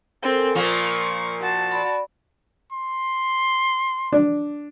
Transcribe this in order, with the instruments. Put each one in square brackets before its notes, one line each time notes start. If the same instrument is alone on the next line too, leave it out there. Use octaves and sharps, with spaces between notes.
[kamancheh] C4 C5 [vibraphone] A4 A#4 G#5
[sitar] A#2 F3 A#3 [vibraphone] A#4 [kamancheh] C#6
[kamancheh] F#4 A5
[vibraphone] D5 B5
[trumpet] C6
[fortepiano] D4